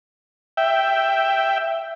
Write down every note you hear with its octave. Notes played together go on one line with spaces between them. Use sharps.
E5 G5